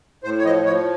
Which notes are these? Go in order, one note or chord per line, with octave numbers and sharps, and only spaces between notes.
A2 C5
C#5
F3 D#5
F3 C#5